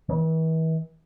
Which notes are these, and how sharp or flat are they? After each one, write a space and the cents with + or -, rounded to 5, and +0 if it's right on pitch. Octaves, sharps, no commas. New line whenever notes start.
E3 -40